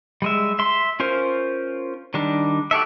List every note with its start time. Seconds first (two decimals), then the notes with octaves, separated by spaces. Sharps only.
0.22 G3 G#3 E5
0.59 E5 C6
1.00 C#4 F4 A#4 C5
2.14 D#3 G3 D4
2.71 F#4 G4 A4 E5